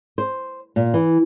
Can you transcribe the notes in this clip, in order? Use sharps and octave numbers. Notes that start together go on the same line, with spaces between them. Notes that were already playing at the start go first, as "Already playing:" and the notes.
C5
A#2
E3